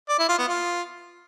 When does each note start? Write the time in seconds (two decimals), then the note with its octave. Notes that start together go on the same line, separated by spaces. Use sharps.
0.09 D5
0.19 E4
0.29 F4
0.39 B3
0.48 F4